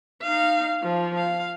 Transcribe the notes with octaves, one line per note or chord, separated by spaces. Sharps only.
D#4 F5
F3
F5